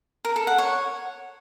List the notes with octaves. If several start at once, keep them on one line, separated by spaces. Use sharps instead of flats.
A#4
A4
F#5
C#5